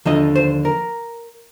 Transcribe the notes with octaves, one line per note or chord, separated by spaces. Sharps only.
D#2 D3 F3 D#5
C5
A#4